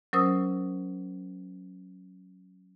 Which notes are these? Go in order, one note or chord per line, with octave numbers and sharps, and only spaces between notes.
F#3 C#4 A#4 C5 D#6 E6